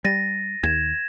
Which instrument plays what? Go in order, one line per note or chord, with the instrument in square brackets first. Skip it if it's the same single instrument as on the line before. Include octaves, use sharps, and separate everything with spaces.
[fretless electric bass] G3 [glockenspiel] A6 A#6 D#7
[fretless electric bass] D#2 [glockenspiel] G#6 E7